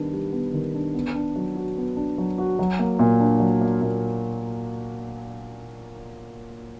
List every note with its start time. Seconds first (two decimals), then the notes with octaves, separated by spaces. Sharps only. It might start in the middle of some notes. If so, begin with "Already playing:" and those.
Already playing: D#3 G3 B3 D4
0.13 G3
0.33 B3
0.53 D#3
0.75 D4
0.95 B3
1.15 D4
1.36 F#3
1.55 F#4
1.77 B3
1.96 D4
2.18 F#3
2.38 F#4
2.59 F#3
2.79 A#3
2.99 A#2
3.20 D4
3.40 F#3
3.61 A#3
3.82 A#2